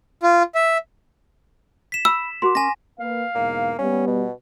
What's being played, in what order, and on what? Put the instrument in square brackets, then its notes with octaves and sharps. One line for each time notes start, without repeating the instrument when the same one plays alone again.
[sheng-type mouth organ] F4
E5
[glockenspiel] B6 E7
[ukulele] B5 [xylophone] E6
[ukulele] F#4 A#4 [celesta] C6 D6
[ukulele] C#4 A#4 [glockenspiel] G#5 A#6
[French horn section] A#3 B4 [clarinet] F5
[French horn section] E2 G#2 B2 [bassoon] A#3
[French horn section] G3 B3 [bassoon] C#4
[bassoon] B2